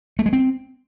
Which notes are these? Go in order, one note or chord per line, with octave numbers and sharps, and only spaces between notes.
A3
G#3
C4